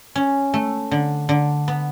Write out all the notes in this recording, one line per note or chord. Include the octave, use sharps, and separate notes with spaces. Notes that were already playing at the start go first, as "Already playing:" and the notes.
C#4
A3
D3
D3
B3